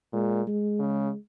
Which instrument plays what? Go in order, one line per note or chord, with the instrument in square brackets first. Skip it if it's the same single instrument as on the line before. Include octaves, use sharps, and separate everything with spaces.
[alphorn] A#2 [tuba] G#3
[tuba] G#3
[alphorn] C#3